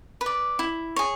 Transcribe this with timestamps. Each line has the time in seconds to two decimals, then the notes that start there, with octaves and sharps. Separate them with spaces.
0.21 B4
0.26 D5
0.59 E4
0.96 G#4 C#5